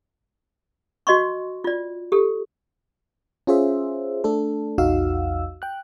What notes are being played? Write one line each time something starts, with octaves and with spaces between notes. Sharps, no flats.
F#4 D#5 C6 C#6
F4 D5
G4 A4
C#4 F4 G#4 C5 E5
A3 D4 A4
A#1 E2 D#4 F#4 F5 E6
G5 F#6